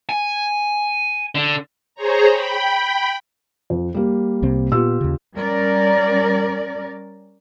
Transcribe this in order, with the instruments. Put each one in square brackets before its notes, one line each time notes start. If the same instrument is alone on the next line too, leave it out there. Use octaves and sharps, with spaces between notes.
[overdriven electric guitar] G#5
D3
[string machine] G#4 C5 C#5 A#5
G5 B5
[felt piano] F2
G3 A#3
[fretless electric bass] C2 C3 C4
[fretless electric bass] A#2 B3 [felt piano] F4 G4 E6
[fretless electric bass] D#2 C#3
[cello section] G3 C#4 A#4 D5